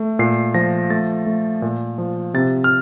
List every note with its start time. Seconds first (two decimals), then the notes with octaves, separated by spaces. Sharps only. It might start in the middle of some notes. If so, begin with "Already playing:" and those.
Already playing: A3
0.19 A#2 C7
0.54 F3 A#6
0.90 A3 A6
1.26 A3
1.62 A#2
1.98 F3
2.34 C3 A6
2.64 F6